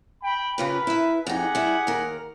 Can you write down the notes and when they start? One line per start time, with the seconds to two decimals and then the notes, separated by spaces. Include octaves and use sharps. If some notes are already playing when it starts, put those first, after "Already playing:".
0.23 G5 B5
0.58 C#3 F4 G4 A#4 B4
0.87 E4 E5
1.27 F2 D#4 G4 G#4 F#5
1.55 G3 E4
1.87 D#2 A#4